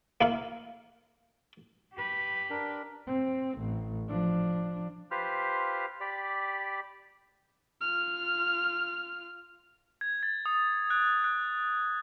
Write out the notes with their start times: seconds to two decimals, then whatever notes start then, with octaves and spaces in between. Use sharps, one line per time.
0.21 A#3 E4 F5
1.95 G4 B4
2.50 D4 A#4
3.07 C4
3.59 A1
4.09 F3 D4
5.11 F4 G4 B4 C5 F6
6.00 G4 D5 B5
7.81 F4 F6
10.01 G#6
10.23 A6
10.46 D#6
10.90 F#6
11.24 F#6